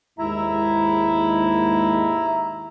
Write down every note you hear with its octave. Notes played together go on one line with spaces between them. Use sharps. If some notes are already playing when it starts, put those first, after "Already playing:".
D#2 G#2 G#3 E4 E5 A#5